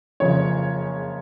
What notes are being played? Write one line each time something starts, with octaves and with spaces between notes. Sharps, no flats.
F#1 F2 C#3 C#5